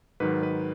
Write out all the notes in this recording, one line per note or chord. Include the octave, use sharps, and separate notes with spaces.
G#2 D#3 F#3 B4
B4